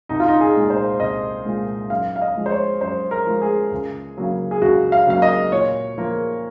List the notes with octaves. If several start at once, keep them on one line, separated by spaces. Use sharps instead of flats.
C2 D#4
F4
D#4
G#4
A#2 G#3
C5
C2 D#5
A#2 G#3
F#2 F5
F5
D#5
F3 G#3
C5
C#5
F#2 C5
A#4
F3 G#3
G#4
C#2
C#3 F#3 A#3
G#4
C#2 F#4
F5
C#3 F#3 A#3 F5
D#5
A#2 C#5
F3 A#3